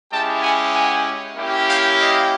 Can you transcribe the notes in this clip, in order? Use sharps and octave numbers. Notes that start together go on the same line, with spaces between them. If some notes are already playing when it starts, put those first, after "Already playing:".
G#3 C#4 E4 G4 G5 A5
F#5 G#5
F#5 G#5
A#3 C#4 E4 G4
F5 G5
D#5 F5